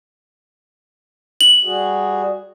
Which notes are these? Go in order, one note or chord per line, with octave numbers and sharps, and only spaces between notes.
F#7
G3 F#4 G#4